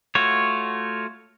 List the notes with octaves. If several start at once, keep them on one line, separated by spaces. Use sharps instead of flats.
A3 F4 F#4 C#5